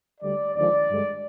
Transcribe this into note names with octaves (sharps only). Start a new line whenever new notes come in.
D2 D3 G3 D5
D#2 D3 F3 G#3 D5
G2 D3 G#3